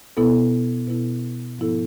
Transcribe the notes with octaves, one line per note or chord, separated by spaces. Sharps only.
B2 B3 E4 A4
B2 B3 E4 A4
G#2 F3 B3 E4 A4